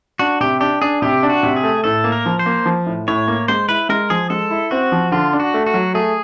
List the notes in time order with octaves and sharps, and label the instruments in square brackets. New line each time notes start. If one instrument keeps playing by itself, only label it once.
[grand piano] D4 [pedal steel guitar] F#4
[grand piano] C3 [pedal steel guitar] G4
[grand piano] D4 [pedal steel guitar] G4
[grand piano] D4 [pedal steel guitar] G#4
[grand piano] C3 [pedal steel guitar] G4
[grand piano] D4
[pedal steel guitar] F#4
[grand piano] C3
[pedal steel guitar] G#4
[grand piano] A3
[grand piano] A2 [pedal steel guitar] A4
[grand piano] A#3
[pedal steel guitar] A#4
[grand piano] F3
[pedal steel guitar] C5
[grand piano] A#3
F3
A2
[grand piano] A2 [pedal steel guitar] C#5
[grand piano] A#3
[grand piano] G#3 [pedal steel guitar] C5
[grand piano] E4 [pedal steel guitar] B4
[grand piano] G#3 [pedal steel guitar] A#4
[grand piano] F3 [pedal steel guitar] G#4
[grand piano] G#3 [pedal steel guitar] A4
[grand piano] E4
[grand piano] C4 [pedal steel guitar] F#4
[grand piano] F3
[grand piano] D3 [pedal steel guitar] F4
[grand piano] D4
[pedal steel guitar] F#4
[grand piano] A3
[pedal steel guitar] F#4
[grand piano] F#3
[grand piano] A3 [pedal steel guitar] G#4